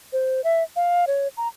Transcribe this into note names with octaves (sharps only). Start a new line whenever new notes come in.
C5
E5
F5
C#5
A#5